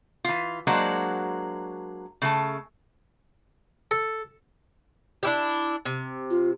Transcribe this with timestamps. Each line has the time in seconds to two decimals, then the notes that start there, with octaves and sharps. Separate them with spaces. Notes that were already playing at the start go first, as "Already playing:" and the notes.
0.24 E3 F4
0.67 F#3 G#3 A#3 D4 F#4 C5
2.22 C#3 A3 A5
3.91 A4
5.23 D4 E4 G4
5.85 C3
6.30 F4